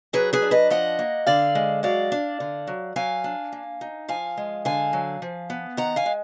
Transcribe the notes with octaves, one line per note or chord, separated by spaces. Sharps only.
F#3 G#4 B4
G#4 B4
D4
B4 D#5
F3 D#5 F#5
A#3
D3 D5 F5
G#3
F#3 D5 F5
D4
D3
F#3
F#3 F5 G#5
D4
A#3
D#4
F3 F5 G#5
G#3
D3 F5 G#5
F#3
F3
B3
D#3 F#5 A#5
F5 G#5
G#3